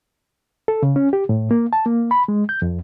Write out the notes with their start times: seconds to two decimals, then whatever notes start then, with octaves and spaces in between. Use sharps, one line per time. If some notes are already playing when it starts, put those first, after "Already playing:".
0.68 A4
0.83 C#3
0.96 C#4
1.13 G4
1.29 A2
1.51 A#3
1.73 A5
1.86 A#3
2.11 B5
2.28 G#3
2.49 G6
2.62 F2